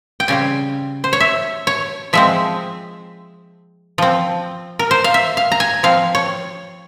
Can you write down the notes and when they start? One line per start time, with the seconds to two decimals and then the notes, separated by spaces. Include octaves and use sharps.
0.20 G5
0.28 C#3 G3 C4 G#5
1.04 C5
1.13 C#5
1.20 E5
1.67 C#5
2.13 F3 G#3 C4 E5
3.98 F3 C4
4.79 A#4
4.91 C5
5.04 F5
5.14 E5
5.37 F5
5.52 A#5
5.60 G#5
5.83 F3 C4 F5
6.15 C#5